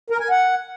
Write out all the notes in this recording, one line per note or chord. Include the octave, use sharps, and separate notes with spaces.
A#4
G#5
F#5